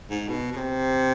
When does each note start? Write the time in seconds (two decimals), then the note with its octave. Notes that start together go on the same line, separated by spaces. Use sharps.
0.10 G#2
0.29 B2
0.52 B2
0.57 C3